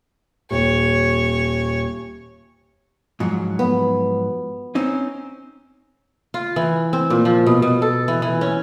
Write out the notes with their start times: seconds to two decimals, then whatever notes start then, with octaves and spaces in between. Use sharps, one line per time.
0.51 D#1 C#5
3.20 G#2 F3 F#3
3.59 B3
4.75 C4 C#4 D#4
6.34 F4
6.56 E3
6.93 C4
7.10 A#2
7.25 F3
7.46 B2
7.62 B2
7.82 A4
8.08 E3
8.22 E3
8.41 C#4